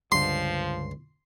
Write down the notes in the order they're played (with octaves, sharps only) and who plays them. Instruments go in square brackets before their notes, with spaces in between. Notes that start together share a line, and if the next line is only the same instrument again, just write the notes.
[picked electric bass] C#2 [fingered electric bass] G2 D3 [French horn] F3 [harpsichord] C6